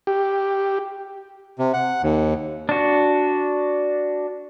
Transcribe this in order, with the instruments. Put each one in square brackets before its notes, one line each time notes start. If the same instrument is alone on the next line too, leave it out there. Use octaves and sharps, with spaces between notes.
[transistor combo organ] G4
[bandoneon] C3
F#5
D#2
[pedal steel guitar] D4 F#4